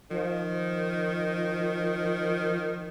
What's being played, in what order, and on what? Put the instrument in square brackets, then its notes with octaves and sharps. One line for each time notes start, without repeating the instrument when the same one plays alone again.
[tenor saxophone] D#3 [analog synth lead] F3